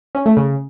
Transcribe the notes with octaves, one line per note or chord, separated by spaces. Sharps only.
C#4
A3
C#3